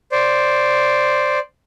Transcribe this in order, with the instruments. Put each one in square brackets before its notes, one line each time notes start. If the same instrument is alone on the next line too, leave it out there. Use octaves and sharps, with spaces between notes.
[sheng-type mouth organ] C5 D5